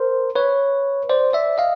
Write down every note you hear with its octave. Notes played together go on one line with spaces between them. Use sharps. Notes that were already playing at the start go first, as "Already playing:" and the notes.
Already playing: A#4 C5
B4 C#5
C5 D5
D5 E5
D#5 F5